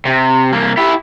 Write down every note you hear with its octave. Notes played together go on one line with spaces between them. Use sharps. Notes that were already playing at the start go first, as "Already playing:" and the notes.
C3
C2 A#3
E4 G4